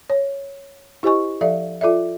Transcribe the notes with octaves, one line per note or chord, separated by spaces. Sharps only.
C#5
E4 G4 C5 D#5 G#5 C#6
F3 A4 D5 E5 F5
F4 A4 D5 E5